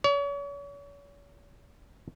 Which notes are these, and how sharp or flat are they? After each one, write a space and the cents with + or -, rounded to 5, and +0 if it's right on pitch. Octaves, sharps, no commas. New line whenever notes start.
C#5 +40